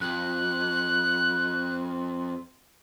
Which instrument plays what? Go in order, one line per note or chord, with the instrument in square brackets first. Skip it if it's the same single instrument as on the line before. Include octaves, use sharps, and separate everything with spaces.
[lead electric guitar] F2 [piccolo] F#6